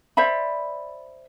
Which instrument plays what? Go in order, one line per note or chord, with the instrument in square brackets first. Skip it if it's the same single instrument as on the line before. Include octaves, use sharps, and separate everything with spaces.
[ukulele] C5 D5 E5 B5